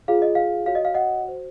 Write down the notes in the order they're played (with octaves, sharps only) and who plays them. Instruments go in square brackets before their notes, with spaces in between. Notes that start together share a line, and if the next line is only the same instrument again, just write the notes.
[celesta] F4 G#4 C#5 F5
D#5
F5
F#4 C#5 F5
D#5
F5
D#5 F#5
F#4 C5